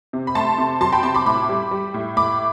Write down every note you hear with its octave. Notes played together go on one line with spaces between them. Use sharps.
C3
B5
A3 A5 C6
C3
F#3 A5 C6
G5 B5
C3 A5 C6
B5 D6
A2 B5 D6
G3
G3
A2
A2 B5 D6